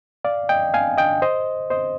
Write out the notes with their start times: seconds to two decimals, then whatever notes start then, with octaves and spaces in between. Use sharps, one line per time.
0.24 D5 F5
0.49 D#5 G5
0.74 F5 G#5
0.98 D#5 G5
1.22 C5 D#5
1.70 C5 D#5